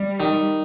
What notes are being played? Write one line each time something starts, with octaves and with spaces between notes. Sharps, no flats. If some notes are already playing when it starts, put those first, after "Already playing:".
Already playing: G3
D#3